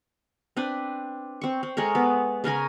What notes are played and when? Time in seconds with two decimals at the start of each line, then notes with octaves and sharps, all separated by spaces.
0.57 C4 D4 B4
1.42 C4 C#6
1.63 C4
1.77 G#3 A4 A#4 C#5
1.95 B3
2.44 C#3 C#4 A#4 G#5